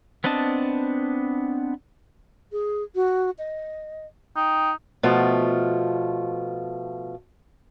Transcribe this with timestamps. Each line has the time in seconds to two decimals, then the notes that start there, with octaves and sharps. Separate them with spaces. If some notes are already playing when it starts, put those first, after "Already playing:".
0.24 B3 C4 D4 D#5 A5
2.52 G#4
2.95 F#4
3.39 D#5
4.36 D#4 G5
5.03 B2 F3 A3 F4